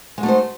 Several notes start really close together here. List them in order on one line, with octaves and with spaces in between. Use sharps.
G#3 F#4 A3 D#4 C5